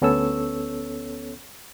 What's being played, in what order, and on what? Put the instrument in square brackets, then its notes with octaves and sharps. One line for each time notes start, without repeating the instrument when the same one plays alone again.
[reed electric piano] D2 B3 C#4 A4 C#5 E6